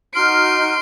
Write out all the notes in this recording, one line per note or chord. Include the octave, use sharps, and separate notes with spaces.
D#4 F#4 C6 F6 D7